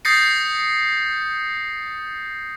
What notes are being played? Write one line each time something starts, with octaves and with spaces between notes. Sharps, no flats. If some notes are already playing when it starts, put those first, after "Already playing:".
D#6 G6 A6 A#6 C7 C#7